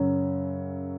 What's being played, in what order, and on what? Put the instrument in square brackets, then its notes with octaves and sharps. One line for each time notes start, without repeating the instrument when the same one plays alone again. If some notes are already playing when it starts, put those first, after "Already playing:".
Already playing: [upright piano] F#2 C#3 F#3